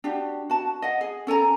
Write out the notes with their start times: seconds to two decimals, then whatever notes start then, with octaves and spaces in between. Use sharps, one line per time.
0.04 D4 F#4 G4
0.50 F#4 A5
0.82 D#5 F#5
1.01 G#4
1.27 C#4 A4 G#5 A#5